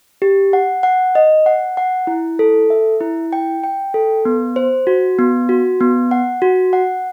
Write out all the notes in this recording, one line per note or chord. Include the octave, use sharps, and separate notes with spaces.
G4
F#5
F#5
D#5
F#5
F#5
E4
A4
E5
E4
G5
G5
A4
B3
C5
F#4
B3
F#4
B3
F#5
F#4
F#5